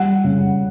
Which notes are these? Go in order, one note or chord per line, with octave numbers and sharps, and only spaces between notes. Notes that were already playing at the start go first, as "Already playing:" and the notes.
Already playing: G3 F#5
C#3